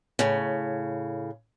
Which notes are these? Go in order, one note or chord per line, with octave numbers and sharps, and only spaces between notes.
A2 C#3